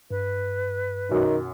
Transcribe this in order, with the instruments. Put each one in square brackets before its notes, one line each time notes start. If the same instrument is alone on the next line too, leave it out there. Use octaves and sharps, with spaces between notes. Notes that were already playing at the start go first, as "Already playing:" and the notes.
[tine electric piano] G2 [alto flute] B4
[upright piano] B1 F#2 [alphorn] D#3